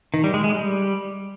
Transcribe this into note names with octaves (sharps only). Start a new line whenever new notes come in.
D#3
G3
G#3
G#3
G3